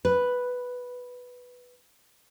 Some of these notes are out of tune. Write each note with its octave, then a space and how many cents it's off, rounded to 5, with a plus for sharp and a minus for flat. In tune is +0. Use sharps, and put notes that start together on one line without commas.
B4 +0